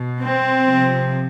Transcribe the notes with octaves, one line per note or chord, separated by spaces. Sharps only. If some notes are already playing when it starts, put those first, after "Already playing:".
Already playing: B2
C4
C3 F3